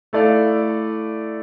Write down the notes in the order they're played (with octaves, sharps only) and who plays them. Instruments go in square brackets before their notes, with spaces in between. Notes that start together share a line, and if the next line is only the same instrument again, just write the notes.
[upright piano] A3 E4 A4 D5 F5